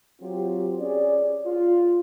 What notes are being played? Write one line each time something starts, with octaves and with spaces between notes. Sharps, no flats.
F#3 C4 F4 G4
C#4 G#4 D5
F4